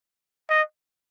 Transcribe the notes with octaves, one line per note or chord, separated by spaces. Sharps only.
D#5